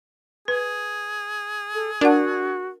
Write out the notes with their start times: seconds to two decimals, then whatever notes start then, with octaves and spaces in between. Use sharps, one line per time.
0.48 G#4 B4
1.74 A4
2.01 D4 F#4 A#4 F#5